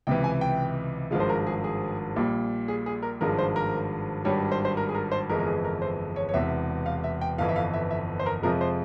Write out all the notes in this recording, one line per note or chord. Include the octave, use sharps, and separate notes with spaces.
C#2 C3 E3 G5
G#5
G5
G#1 G2 F3 G#3 F5
C5
A#4
G#4
G#4
A#1 A#2 G3
G#4
G#4
A#4
G#1 G2 F3 G#3 A#4
C5
A#4
G#1 G2 G3 C#5
C5
C5
A#4
G#4
A#4
C5
G1 F2 E3 G#3 A#4
A#4
G#4
A#4
C5
C#5
C#5
E1 E2 C3 E5
F5
E5
G5
G1 F2 E3 F5
E5
F5
E5
E5
C5
A#4
F2 C3 F3 G#3 A#4
C5